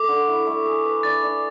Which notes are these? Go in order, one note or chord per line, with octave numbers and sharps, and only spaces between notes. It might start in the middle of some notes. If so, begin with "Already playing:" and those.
Already playing: A3 D6
D3
E4
A3
G#4
B4
D4 A6
D4